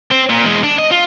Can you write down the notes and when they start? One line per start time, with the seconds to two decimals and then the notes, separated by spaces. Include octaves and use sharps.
0.11 C4
0.29 A#2
0.44 E2 G#3
0.64 D4
0.79 D#5
0.91 F4